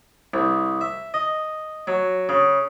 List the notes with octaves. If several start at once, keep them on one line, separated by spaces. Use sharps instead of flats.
C2
E5
D#5
F#3
C#3